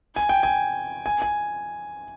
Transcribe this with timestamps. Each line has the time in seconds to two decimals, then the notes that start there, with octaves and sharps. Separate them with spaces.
0.16 G#5
0.29 G5
0.43 G#5
1.06 G#5
1.22 G#5